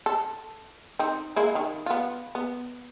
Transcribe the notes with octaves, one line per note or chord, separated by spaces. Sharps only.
A4
C4 D#4
G#3 A#3 E4
D#3
B3 F4
B3